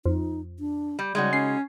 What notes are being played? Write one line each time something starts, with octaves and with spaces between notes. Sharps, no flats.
F2 D#4
D4
G3
C#3 G3 G#3 D#4 F#4
C#4 C7